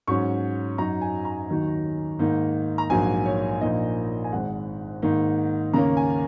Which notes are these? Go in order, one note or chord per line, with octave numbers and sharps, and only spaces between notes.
G#2 F#3 C#4 C#6
F#2 F#3 D#4 A#5
G#5
A#5
D#2 D#3 F#3 D#4
G#2 D#3 A#3 D#4
A#5
A#1 G#2 F#3 A#3 G#5
C#5
A#1 A#2 A#3 D#4 D#5
G#5
G#1 G#2 G#3 F#5
G#2 D#3 A#3 D#4
D#2 C#3 A#3 C#4 A#5
G#5